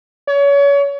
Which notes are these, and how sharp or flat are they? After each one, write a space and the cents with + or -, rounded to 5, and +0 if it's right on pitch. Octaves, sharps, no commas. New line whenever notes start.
C#5 +30